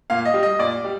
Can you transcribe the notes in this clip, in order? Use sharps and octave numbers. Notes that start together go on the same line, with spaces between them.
A#2 F5
D#5
G3
D#5
A#2 D5
G3